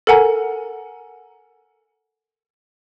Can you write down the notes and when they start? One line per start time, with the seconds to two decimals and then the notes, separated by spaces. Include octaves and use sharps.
0.07 A4 A#4 F#5 G#5 A#5